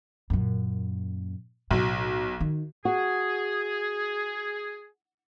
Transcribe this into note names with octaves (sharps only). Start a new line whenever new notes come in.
F#2 A#2
B1 A2
D#3
F#4 G#4